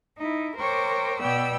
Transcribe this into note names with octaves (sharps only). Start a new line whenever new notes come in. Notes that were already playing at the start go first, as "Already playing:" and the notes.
D#4 E4
A#4 C5 C#5 G5 C#6 D6
B2 B3 D5 G5 E6